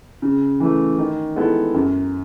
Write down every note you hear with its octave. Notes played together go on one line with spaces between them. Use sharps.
C#3
E3 A3
D#3
G#3 B3 E4 A4
F#2